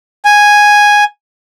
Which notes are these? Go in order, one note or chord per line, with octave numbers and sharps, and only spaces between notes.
G#5